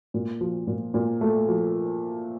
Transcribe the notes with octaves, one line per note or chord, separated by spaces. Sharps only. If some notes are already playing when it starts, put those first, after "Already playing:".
A#2
F3
A#2
A#2
A3
F3